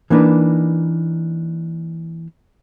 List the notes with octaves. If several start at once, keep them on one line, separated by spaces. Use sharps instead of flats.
E3 A#3 D4 D#4 B4